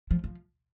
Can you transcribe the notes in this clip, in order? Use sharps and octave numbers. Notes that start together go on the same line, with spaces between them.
F3
F3